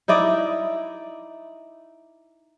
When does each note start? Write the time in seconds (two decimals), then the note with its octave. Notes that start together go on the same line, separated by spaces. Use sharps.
0.08 D#4 E4 D5 D#5